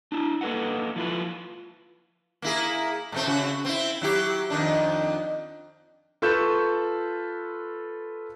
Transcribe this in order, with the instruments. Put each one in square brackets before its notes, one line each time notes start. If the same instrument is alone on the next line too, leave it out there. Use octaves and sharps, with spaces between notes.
[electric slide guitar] D4 E4
A#3 A4 B4 D#5 F#5
F3 E4 F4 B4
[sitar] A#3 E4 G#4
A2 A3 C4
C#3 F#4
C4 E4
F#3 E4 G4
F2 D#3 D4
[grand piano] F4 A4 B4 C#6 G6 E7